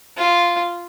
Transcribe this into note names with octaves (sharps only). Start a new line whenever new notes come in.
F4